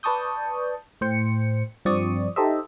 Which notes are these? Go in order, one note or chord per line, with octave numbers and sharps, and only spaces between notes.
B4 D5 A5 C#6 D#6 G6
A2 C5 G5 C#7
G2 F3 C4 D5 C#6 D#6
D#4 G4 A4 C5 D#5 E5